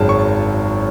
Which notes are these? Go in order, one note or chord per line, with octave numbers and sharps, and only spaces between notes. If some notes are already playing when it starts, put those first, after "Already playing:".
Already playing: G#1 F#2 C#3 A5
C#6